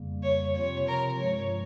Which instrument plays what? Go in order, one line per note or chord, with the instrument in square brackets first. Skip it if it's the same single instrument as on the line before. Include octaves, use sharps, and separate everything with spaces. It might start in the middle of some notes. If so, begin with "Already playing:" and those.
Already playing: [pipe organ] F2 C#3 G3 A#3
[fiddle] C#5
[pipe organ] C3 F3 C4 F4 [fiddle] C#5
[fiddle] A#4
[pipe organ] G2 F3 G#3 [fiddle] C#5